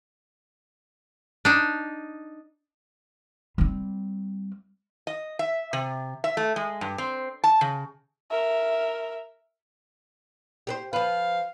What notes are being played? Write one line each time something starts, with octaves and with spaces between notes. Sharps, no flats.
D4 D#4
G3 C4
D#5
E5
C3
E5
A3
G#3
G2
C4
A5
C#3
A#4 E5
G4 B4 C5
F3 B4 F5